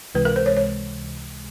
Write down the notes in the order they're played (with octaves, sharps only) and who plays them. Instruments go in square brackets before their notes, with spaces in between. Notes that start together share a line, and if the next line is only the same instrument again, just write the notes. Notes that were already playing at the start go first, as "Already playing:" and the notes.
[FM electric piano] C#2 C3 E3 G#3 [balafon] B4
[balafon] A#4
C5
C#5
C#5